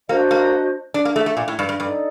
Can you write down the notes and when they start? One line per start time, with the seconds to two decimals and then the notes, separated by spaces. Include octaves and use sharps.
0.09 A#3 D4 F#4 C5 D#5
0.31 A#3
0.94 D4
1.05 A#3
1.16 A3
1.26 A3
1.37 A#2
1.48 A2
1.59 G2
1.69 G2
1.80 G2 D#4 A4 D5